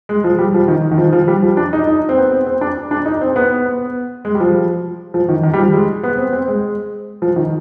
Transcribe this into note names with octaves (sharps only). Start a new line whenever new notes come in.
G#3
F3
G3
F3
D#3
D#3
F3
F3
G3
F3
D4
D#4
D#4
C4
B3
C4
C4
D4
D4
D#4
C4
B3
B3
G#3
G3
F3
F3
D#3
D#3
G3
F3
G#3
B3
C4
C4
G#3
F3
D#3